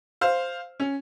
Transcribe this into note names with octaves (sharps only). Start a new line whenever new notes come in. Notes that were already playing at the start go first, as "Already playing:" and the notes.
C5 F5
C#4